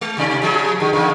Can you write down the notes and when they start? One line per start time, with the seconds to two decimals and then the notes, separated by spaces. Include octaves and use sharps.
0.01 G#3
0.17 D#2 C3 D5
0.42 C#3 F3 G#4
0.80 D3 D#3
0.93 E2 D3 D#3